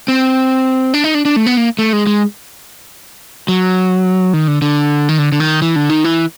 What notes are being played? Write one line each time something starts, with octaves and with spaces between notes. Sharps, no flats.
C4
D4
D#4
D4
D4
A3
B3
A#3
A3
G#3
G#3
F#3
D#3
D3
D3
D#3
D3
D3
D#3
E3
D3
D#3
E3